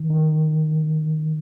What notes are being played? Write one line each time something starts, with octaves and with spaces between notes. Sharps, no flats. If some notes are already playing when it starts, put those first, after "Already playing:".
Already playing: D#3
D#3